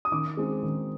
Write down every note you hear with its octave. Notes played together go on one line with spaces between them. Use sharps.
D#6
D#3 D6
G#3 C4 D#4
D#3